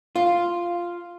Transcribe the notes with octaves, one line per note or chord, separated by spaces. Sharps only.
F4